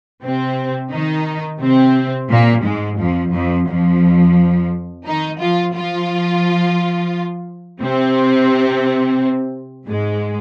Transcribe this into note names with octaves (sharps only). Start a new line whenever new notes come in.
C3 C4
D#3 D#4
C3 C4
A#2 A#3
G#2 G#3
F2 F3
F2 F3
F2 F3
D#3 D#4
F3 F4
F3 F4
C3 C4
G#2 G#3